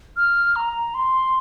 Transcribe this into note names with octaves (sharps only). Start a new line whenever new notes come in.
F6
A#5
C6